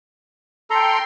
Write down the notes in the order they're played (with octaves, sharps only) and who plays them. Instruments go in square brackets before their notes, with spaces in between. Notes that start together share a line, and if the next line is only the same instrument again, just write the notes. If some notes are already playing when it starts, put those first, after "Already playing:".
[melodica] A4 A#5 [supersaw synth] G5 C6